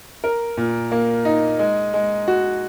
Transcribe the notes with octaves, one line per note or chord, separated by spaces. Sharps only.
A#4
A#2
A#3
D#4
G#3
G#3
F#4